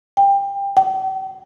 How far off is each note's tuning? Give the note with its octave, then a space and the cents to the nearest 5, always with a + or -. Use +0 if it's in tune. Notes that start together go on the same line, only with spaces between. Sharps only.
G5 +25
G5 -45